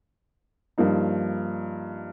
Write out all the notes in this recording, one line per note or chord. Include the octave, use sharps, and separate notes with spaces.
G2 F3 A#3 D#4